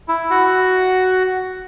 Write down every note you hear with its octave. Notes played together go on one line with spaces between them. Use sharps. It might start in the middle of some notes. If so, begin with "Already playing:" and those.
E4
F#4